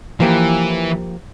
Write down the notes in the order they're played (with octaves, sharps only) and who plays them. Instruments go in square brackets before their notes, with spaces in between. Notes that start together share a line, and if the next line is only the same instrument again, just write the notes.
[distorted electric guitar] E3 [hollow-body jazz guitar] F3 A#3 G4